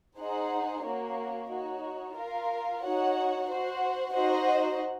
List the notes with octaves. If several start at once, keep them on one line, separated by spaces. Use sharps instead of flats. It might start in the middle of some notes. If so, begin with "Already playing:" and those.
D#4 G#4 C5 F#5
A#3 C#4 F#4 C#5
D#4 F#4 C#5
F4 A#4 F5
D#4 F#4 C#5 F#5
F#4 C5 F#5
D#4 F#4 C5 D#5 F#5